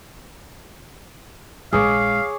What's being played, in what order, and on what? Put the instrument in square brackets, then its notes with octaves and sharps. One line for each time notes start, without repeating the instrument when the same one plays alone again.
[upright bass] A#1 G#3 [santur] G#4 C#5 D6 [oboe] F5